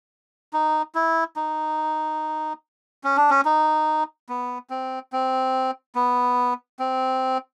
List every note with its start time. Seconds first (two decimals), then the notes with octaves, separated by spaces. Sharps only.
0.53 D#4
0.95 E4
1.36 D#4
3.04 C#4
3.17 D4
3.30 C#4
3.45 D#4
4.29 B3
4.70 C4
5.12 C4
5.95 B3
6.79 C4